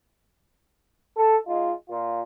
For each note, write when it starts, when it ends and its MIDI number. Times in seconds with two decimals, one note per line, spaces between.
1.16 1.36 69
1.46 1.72 56
1.46 1.72 63
1.46 1.72 65
1.90 2.22 46
1.90 2.22 65